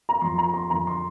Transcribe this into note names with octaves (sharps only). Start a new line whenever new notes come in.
A#5
F2 F3 C6
A#5
C6
F2 D3 F3 A#5
C6